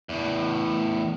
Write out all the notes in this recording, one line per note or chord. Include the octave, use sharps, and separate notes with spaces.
E2 A2